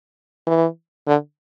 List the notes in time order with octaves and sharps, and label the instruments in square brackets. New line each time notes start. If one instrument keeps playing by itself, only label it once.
[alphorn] E3
D3